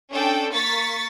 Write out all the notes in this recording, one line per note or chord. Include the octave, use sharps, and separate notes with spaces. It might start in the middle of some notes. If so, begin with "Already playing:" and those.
C#4 D4 A4 G5
A#3 C#6 A6 B6